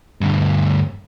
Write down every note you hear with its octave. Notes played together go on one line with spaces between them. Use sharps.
D2 G2